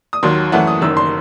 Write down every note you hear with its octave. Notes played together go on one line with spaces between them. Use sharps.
D#6
D#2 D#3 F#3 C6
F#2 E3 A3 F#5
D#6
F#1 F#2 D#3 E6
C6